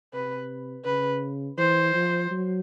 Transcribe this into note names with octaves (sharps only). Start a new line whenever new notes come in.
C3 B4
C#3 B4
E3 C5
F3
F#3